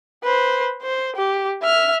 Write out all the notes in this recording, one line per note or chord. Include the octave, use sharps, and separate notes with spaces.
B4 C5
C5
G4
E5 F6